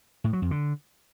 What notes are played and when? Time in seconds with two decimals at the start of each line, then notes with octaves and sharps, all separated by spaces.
0.24 A2
0.33 F#3
0.42 F2
0.51 D3